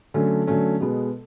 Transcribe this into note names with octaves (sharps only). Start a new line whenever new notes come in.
D3 F#3 A3 C#4 A4
D3 F#3 A3 C#4
B2 G#3 B3